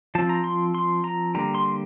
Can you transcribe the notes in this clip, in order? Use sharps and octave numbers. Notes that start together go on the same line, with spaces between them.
F3 C4 A5
A#5
C6
C6
A#5
D3 G3 A#3 A#5
C6